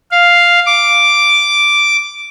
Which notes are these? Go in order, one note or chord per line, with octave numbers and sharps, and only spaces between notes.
F5
D6